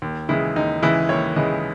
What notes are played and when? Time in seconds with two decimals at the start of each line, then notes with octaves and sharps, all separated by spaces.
0.02 D#2
0.29 C#3 E3 G#3 E4
0.56 D#2 D#4
0.82 C#3 E3 G#3 E4
1.09 D#2 C#5
1.36 C#3 E3 G#3 D#5